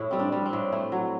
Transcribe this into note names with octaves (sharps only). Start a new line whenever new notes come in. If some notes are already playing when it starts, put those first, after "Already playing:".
Already playing: A2 E4
G3 C4
D4
G3
C4
A2
A3 E4
F#3